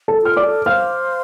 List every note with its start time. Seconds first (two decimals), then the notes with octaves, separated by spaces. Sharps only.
0.08 A4 A5
0.22 F4 F6
0.37 D5 D6
0.44 A4
0.66 C5 F5 F6